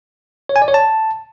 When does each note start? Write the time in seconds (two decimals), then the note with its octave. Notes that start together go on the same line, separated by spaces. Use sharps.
0.49 C#5
0.56 G#5
0.62 D5
0.68 C#5
0.74 A5